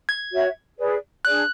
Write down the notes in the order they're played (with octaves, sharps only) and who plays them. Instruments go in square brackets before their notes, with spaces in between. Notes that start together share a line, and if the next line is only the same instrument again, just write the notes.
[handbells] G#6
[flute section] F#4 C#5 E5
G#4 B4 D5
[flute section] D4 G#4 D5 [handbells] F#6